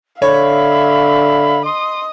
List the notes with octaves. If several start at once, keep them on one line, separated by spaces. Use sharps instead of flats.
D3 C#5 E5 F5 B5
D#5 C6 D#6